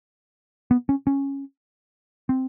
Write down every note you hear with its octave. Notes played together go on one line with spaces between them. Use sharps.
B3
C#4
C#4
C4